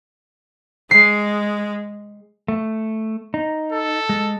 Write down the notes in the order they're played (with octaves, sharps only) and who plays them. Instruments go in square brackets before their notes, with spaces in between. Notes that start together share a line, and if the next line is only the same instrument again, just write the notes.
[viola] G#3 [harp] C7
[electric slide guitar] A3
D#4
[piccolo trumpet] A4
[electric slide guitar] G#3